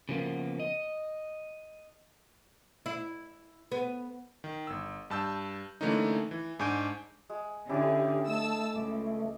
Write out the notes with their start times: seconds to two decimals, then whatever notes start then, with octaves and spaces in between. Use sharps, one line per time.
0.09 C#3 F3 A#3 B3
0.60 D#5
2.86 E4
3.72 B3
4.44 D#3
4.67 G1 E6
5.10 G2 A5 E6 G6
5.81 D3 E3 A3 A#3 C#4 D#4
6.31 E3
6.59 G#2 D4 G#5 C#6 G6 D7
7.29 G#3
7.69 D3 C#4 E4 G4 G#4
8.28 G#3 A3 A5 E6
8.75 C#2 D6